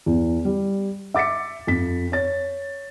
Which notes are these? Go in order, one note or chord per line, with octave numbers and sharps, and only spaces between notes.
E2
G3
E5 D6 A6 B6 C#7
F2 B6
C#5 A6